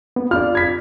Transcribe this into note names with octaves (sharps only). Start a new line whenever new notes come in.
B3
F4 D5 F6
G#6 B6